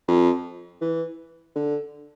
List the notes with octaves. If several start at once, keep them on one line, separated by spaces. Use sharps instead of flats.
F2
E3
D3